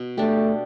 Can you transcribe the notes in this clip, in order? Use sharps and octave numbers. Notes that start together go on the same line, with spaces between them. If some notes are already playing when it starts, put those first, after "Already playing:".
Already playing: B2
G3 A3 D4 G4